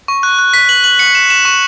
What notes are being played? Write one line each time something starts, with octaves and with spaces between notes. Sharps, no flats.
C#6
F#6
F#6
B6
F#7
F#7
C#7
E7
E7
C#6